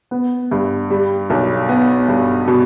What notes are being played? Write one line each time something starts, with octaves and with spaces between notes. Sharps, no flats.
B3
G2
G3
B1
B3
G2
B2